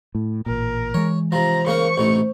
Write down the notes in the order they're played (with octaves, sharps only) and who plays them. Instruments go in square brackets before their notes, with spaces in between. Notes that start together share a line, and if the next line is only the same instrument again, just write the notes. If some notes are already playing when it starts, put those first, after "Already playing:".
[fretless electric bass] A2
[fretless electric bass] A1 A#2 [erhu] A#4
[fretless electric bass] E3 G#3 [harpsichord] C#5
[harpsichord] C3 F3 [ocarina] C5 [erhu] A#5
[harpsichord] C#3 A#3 A#4 [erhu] C#6
[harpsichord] A1 C3 D#4